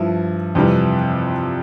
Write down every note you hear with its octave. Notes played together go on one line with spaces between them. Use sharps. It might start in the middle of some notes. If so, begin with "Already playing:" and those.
Already playing: G2 F3 E4
F2 C3 E3 G3